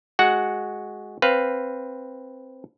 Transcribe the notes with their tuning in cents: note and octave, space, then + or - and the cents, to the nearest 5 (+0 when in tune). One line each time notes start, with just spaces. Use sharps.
G#3 +10 F#4 +0 F#5 +0
C4 +5 B4 +0 F5 +0